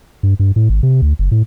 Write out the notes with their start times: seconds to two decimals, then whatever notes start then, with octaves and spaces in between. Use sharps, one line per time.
0.23 G2
0.40 G2
0.56 A2
0.69 G#1
0.83 C3
1.02 D2
1.19 F#1
1.31 A2